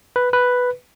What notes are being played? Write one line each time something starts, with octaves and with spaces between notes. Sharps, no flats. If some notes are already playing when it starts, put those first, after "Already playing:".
B4
B4